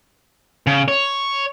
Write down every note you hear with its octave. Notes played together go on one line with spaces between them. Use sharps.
C#3
C#5